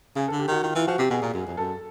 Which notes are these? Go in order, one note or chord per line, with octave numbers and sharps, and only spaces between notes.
C#3 G#4
D3 A4
G4
D#3 F#4
D#3 F4
E3 F4
F3 F#4
C3 G4
B2 G#4
A#2
F#2
F2
F#2 A4